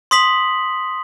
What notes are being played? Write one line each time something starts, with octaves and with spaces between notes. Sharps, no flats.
C6 D#6 B6 F#7